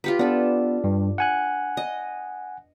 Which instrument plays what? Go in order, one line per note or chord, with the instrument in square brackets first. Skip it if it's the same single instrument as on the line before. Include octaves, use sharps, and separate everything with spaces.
[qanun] F4 G4 B4
[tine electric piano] B3 [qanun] D4 A4
[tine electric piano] G2
F#5 G#5 F#6
[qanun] D#5